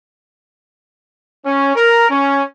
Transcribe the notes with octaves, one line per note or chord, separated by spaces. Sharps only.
C#4
A#4
C#4